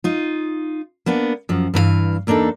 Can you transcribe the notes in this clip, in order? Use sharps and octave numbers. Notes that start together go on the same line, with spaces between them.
D#4 F4
A#3 B3 D4
F#2 F3
G2 E3 A4 F5
E2 A#3 D4 D#4 A4